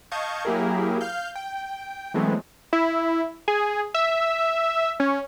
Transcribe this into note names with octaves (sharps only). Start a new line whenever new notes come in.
D#5 F5 A5 C#6 G6 G#6
F#3 A#3 E4 G4 G#4 A#4
F5 F6 G6
G5
E3 F#3 G#3 A3 B3 C4
E4
G#4
E5
C#4